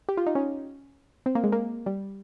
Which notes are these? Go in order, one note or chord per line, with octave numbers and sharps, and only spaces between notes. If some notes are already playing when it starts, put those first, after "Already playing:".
G4
F4
D#4
C#4
C4
A#3
G#3
A#3
G3